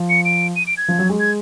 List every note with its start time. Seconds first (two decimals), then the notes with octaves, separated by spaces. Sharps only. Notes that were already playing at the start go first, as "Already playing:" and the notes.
Already playing: F3
0.10 C#7
0.25 D7
0.56 D#7
0.67 D7
0.77 G#6
0.88 F3
0.99 F#3
1.09 G#3
1.20 G#6